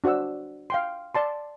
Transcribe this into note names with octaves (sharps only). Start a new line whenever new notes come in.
D4 F#4 C5 F#5 E6
F5 G5 C6
D5 A5 C6